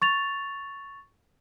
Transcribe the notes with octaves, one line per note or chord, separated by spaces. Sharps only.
C#6 A6 F7